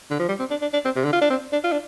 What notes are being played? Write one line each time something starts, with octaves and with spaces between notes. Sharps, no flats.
D3
F3
G3
C4
D4
D4
D4
C4
C3
D3
F4
D4
C4
D4
F4
D4